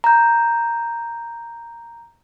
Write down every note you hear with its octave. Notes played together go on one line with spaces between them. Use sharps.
A#5 G6